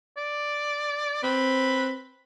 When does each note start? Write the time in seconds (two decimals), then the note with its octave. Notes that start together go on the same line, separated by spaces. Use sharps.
0.17 D5
1.23 C4 B4